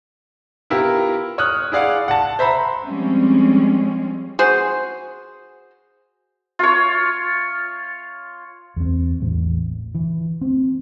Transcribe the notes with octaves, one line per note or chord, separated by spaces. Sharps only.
B3 E4 F4 G4 A#4
C#5 D#6 F6 F#6
E4 G#4 D5 F5 F#5
F#5 A5
C5 E5 A#5 B5
F3 G3 G#3 C4 C#4
F#4 G#4 C5
F4 C#5
E2 C4
A1 E2 A2
E3
C4